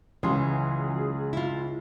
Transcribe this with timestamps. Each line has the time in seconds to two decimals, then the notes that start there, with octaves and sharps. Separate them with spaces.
0.23 C#2 E3 F#3 G#4 C6
1.33 E4 F4